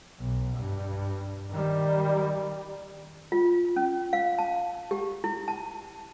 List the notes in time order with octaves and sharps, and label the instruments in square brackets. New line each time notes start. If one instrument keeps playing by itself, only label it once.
[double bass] B1
G2
D#3 G3
[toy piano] F4
C#4
F5
A5
G4
E4
A5